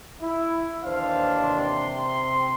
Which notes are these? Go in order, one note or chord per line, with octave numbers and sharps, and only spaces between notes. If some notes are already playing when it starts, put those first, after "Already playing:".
E4
D#2 E3 D4 C5 F5
C3 C6